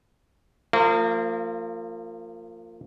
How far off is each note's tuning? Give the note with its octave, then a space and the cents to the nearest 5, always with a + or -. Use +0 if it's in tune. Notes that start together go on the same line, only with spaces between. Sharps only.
F3 +0 A#3 -35